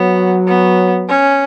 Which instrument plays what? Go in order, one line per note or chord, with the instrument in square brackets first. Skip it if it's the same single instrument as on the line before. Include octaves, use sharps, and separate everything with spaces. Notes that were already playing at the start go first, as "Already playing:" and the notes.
Already playing: [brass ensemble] F#3 [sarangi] B3
[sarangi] B3
C#4